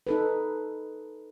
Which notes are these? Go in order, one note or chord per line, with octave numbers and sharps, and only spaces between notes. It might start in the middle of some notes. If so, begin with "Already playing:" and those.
D#4 A4 B4